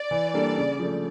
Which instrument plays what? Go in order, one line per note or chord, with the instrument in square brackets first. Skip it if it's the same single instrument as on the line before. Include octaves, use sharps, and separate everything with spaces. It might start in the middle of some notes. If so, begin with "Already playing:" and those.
Already playing: [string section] D5
[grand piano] E3
G3 A#3 D4 A4
C#3
F3 A3